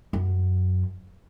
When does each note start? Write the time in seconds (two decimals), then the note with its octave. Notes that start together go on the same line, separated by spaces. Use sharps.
0.13 F#2